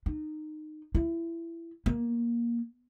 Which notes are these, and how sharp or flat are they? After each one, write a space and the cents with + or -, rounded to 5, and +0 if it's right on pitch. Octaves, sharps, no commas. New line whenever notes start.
D#4 -20
E4 +20
A#3 +15